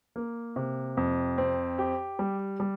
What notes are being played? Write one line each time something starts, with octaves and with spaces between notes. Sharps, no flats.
A#3
C3
F2
C4
G4
G3
G3